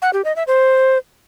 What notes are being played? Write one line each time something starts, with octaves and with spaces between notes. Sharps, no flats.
F#5
G4
D#5
E5
C5